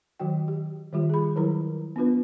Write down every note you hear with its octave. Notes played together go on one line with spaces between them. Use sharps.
D#3 F#3 F#4 G5
G4
D#3 G3 F4 G4
G#4 B5
D#3 F#3 E4 A#4 B4 A#5
B3 D4 F4 B4